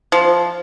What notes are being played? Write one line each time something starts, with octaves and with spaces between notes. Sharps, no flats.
F3